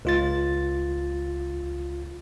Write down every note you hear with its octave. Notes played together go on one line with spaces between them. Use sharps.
C#2 F4 A6